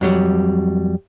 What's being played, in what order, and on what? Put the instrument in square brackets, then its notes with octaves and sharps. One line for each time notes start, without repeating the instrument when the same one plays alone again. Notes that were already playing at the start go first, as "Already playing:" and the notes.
[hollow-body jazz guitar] F2 F#3 G3